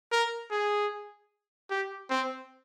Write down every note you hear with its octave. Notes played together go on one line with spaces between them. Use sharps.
A#4
G#4
G4
C4